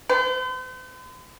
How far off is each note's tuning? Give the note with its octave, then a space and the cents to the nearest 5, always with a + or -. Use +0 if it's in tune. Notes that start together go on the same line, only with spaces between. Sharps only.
C5 -45